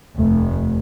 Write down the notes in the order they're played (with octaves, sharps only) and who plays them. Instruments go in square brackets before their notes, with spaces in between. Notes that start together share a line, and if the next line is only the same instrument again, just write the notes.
[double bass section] F1 [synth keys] D#2 A3